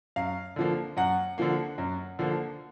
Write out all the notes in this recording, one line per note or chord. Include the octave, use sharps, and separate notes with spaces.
F#2 F5
D3 F3 A#3
F#2 F#5
D3 F3 A#3
F#2
D3 F3 A#3